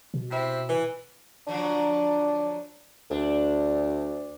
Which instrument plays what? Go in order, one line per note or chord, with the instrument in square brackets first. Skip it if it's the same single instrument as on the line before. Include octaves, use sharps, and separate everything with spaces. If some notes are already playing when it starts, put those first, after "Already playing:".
[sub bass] B2
[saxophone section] C3 C4 E4
E3
[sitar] D3 F3 F#3 [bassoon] D4
[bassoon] D2 [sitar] D4